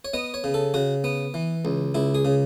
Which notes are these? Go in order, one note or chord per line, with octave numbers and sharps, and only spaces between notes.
C#5
B3 D#5
C#5
C#3
A4
C#3 F#4
B3
E3
C#2
C#2 E4
G#4
C#3